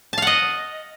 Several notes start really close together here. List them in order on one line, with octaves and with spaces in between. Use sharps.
A5 F5 F#5 D#5